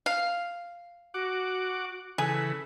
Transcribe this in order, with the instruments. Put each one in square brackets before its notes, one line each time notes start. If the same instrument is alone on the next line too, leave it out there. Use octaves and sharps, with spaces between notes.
[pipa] F5
[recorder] F#4 [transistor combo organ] F#5 D6
[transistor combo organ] C#3 E3 B4 [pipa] G#4 [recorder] A4